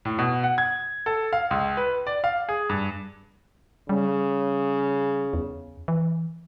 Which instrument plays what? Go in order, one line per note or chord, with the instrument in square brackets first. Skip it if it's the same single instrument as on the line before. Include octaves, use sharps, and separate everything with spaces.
[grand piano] A2
B2
F#5
G#6
A4
F5
C#2
B4
D5
F5
G#4
G2
[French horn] C#3 [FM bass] G3
[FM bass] E2
E3